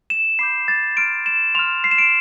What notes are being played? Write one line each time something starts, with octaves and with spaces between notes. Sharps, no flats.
E7
B5 D6 G6 C7
A6
C6 F6 D7
E7
C6 F6 F7
C7
E7
D7